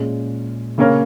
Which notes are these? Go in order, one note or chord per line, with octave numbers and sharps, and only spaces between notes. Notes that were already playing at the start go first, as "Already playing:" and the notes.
Already playing: A#2 G#3 C#4
C#3 A#3 C#4 A#4 C#5